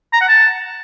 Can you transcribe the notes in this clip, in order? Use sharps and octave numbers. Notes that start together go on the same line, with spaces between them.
A#5
F#5
A5